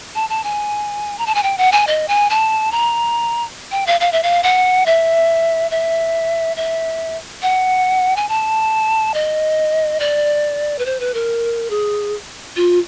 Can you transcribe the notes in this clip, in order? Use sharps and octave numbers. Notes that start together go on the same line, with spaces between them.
A5
A5
G#5
A#5
A5
G#5
G5
F#5
G#5
D#5
G#5
A5
A#5
G5
F5
F5
E5
F5
F#5
E5
E5
E5
F#5
G#5
A5
D#5
D5
B4
C5
B4
A#4
G#4
F4